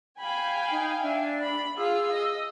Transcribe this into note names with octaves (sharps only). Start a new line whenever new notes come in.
F5 G5 G#5 B5
D#4
D4 E5
B5
F4 G#4 E6
D#5